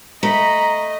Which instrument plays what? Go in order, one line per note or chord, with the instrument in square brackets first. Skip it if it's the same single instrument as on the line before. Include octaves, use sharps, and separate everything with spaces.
[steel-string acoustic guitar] A3 [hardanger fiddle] D#5 [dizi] A#5 [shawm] B5